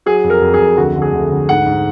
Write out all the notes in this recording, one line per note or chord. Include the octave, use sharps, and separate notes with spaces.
F#3 G#4
F2
A#4
F2
G#4
F2
D2 F#4
D3
G#4
D2
D2
G#2 F#5
G#2